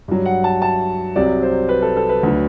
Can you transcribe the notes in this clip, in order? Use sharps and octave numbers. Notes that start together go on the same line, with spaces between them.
G2 F#3
F#5
A5
A5
C2 C3 F#3 D5
C5
B4
A4
A4
B4
D2 D3 F#3